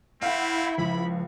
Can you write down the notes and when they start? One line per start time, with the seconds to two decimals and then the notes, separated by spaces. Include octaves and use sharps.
0.22 A3 C4 E4 F5 F#5
0.78 C#2 F3 B5